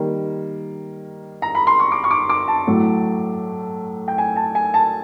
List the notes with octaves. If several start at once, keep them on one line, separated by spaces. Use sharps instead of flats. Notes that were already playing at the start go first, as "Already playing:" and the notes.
Already playing: D#3 G3 A#3
A#5
B5
C6
C#6
D6
C#6
D6
D6
A5
A2 F#3 A3
G5
G#5
A5
G#5
A5